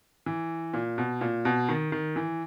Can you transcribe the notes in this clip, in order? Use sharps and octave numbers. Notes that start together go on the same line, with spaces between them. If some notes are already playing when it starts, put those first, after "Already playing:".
E3
A#2
B2
A#2
B2
D#3
D#3
E3